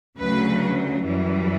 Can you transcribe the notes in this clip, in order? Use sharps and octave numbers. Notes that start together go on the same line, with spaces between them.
D2 C#3 F#3 B4
F#2 E3 G3